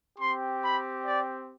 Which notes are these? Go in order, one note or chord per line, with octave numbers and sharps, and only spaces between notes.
C4 G4 C6
B5
D5